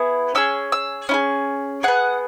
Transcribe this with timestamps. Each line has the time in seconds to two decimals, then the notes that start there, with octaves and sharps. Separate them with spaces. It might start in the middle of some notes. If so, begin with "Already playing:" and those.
Already playing: B3 E4 G#4
0.35 C#4 G#4 E6
0.72 E6
1.09 C#4 E4
1.14 G#4
1.83 B3 G#4 F#5